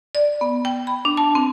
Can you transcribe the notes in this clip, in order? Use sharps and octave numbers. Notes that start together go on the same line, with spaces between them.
D5
B3
G5
B5
D4
A5
C4